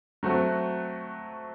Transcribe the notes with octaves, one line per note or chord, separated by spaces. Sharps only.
F#3 A3 C4 F#4